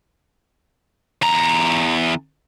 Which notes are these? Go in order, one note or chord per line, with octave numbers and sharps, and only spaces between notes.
E2 A#5